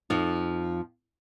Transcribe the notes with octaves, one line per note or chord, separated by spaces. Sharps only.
F2 F3 D#4